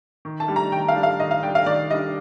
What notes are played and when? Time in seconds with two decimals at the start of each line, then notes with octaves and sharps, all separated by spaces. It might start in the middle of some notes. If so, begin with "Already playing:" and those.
0.25 D#3
0.40 A5
0.48 G3 D4
0.56 A#5
0.72 D#3 G5
0.88 F5
0.96 G3 D4
1.03 F5
1.20 D#3 D#5
1.31 F5
1.42 G3 D4 G5
1.55 F5
1.66 D#3 D5
1.90 G3 D#5
1.94 D4